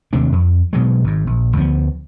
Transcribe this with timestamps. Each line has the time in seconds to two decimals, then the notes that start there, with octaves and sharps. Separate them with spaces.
0.13 D#2 C3 A3 D4
0.32 F2
0.73 B2 F#3 G#3
1.04 G#1 G#2
1.27 A#1
1.56 D2 F3 A3 B3